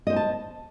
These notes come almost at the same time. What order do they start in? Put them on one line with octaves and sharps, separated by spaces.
D#5 C5 G#5 A5